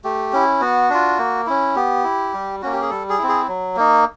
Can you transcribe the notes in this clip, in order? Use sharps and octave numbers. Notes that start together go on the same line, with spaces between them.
A3 G4
C#4 E4
B3 F#4
D4 F4
A#3
C#4 E4
B3 G4
E4
G3
A#3 C#4 F#4
G4
G#4
G3 A4
G#4
C4 E4
G#4
F#3
A#3 D#4